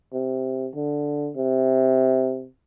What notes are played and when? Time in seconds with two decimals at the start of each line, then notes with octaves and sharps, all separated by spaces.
0.13 C3
0.75 D3
1.36 C3